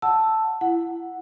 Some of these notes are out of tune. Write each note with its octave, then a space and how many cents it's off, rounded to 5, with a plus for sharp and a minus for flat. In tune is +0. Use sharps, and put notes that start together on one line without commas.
F#5 +0 A5 +0 E6 +0
E4 +30 F#5 +0